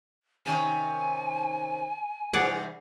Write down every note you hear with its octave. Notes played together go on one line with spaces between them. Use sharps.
C3 D#3 C#4 G#5
G2 C3 E3 G#4 D5 F#5